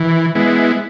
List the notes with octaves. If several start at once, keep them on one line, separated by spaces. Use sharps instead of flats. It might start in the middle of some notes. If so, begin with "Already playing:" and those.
Already playing: E3
G#3 B3 E4